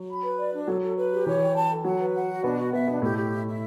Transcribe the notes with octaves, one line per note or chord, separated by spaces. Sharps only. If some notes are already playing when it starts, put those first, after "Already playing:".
Already playing: F#3
B5
B4
D5
D4
F#3 A4
A4
B4
G4
E3 C#5
G5
A5
A4
F#3 F#5
B4
F#5
F#4
B2 B3 D4
F#4
B2 B3 E5
B2 B3 D4
A2 A3 G4
G4
E4
E4